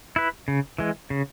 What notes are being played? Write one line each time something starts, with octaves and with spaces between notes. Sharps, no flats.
E4 B4
C#3
E3 G#3
C#3